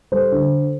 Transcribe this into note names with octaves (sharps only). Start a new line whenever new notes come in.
G3 A4 C5
D3